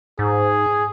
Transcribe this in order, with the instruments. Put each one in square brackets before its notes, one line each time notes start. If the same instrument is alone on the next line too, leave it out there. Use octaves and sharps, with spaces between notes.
[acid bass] G#2 [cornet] G#4